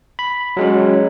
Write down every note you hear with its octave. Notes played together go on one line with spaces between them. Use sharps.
B5
F#3 G#3 C#4